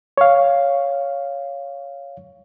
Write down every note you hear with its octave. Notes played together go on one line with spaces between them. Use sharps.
C#5 F5